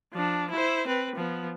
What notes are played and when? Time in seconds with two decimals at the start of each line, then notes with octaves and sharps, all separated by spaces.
0.13 F3 D4
0.51 E4 C5
0.87 C4 B4
1.16 F3 B3